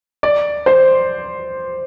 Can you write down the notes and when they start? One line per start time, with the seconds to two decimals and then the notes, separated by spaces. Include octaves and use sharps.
0.23 D5
0.66 C5